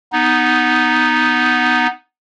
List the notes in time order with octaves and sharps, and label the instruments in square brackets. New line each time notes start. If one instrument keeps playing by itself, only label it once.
[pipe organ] B3 D#4